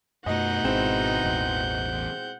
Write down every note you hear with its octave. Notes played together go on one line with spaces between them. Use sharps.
F#2 B2 A3 D#4 D#5 F#5 G6
G#1 G#3 C4 E4
A1 E2